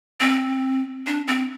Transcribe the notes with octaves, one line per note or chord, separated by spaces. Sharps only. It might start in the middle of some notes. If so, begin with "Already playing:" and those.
C4
D4
C4